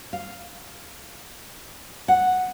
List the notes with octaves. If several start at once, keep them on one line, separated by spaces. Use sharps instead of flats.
F5
F#5